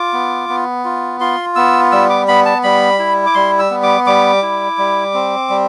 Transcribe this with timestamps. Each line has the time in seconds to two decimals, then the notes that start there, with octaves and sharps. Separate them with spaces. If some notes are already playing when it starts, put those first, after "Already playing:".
Already playing: F4 D6
0.13 B3
0.49 B3
0.85 F4
1.20 F4 C6
1.56 B3 E6
1.92 G3 E6
2.10 D6
2.28 B3 B5
2.45 A5
2.63 G3 B5
2.99 E4
3.26 D6
3.35 G3 C6
3.59 E6
3.70 B3
3.83 D6
4.07 G3 D6
4.42 E4
4.78 G3
5.14 C4
5.50 G3